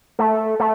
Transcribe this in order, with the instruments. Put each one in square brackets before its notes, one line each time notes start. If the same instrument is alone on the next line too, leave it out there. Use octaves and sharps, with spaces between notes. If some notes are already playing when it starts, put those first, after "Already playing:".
[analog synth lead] A3
A3